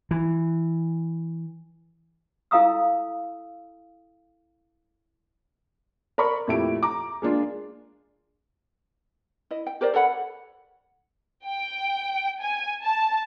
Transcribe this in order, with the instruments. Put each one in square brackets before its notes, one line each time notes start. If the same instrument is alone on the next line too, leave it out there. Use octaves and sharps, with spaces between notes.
[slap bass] E3
[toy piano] E4 A4 F5 A#5 D#6 E6
[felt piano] A#4 D5 B5 C#6
F2 A#2 A3 E4 G4 D7
A#5 D6
G#3 A#3 D4 F4
[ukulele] E4 D#5
G5
G4 A#4 C5 D5
A4 C#5 F#5 B5
[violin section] G5
G#5
A5